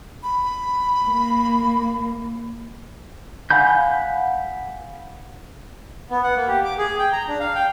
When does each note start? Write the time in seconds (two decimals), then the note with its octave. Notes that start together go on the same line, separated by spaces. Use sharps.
0.23 B5
1.04 A#3
3.50 F5 F#5 G#5 B5 G6
6.10 B3
6.24 F#5
6.36 A#3
6.48 G4
6.65 D6
6.78 G#4
6.99 G5
7.12 A#5
7.28 D4
7.40 F5
7.55 G5